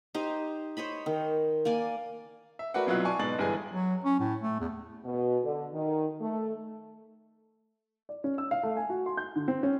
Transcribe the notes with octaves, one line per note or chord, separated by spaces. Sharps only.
D#4 G4 C5 D#5
C5 C#5 D#5 B5
D#3
A#3 D5 G#5
E5
A3 F#4 A#4 B4 D5 F#5
C2 B2 F#3 E4 F4 F#6
D5 G#5 A5 C#6
G#2 B2 G#3 A6 F#7
G1 E3 G3 G#4 G#5
F#3
C#4
A2
A3
E2
B2
D3
D#3
A3
D5
C#4
E6
F5
A3
G#5
F#4
C6
G6
D3
C4
C#4